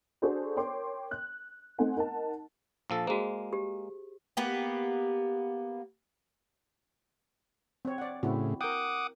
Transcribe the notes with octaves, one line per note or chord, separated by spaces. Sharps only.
D4 F#4 G#4 A4 C5 D5
A#4 C#5 G5 C6 D6
F#6
A3 C4 D#4 F#5 G#5
D#4 A#4 F#5 A5
A#1 F3 A4
G#3 A#3 F#4 G#4 C5
G4
A#3 B3 G4
C4 C#5
D5 F#5
A2 C#3 C4 E4 F#4
A#4 F#5 G5 D6 D#6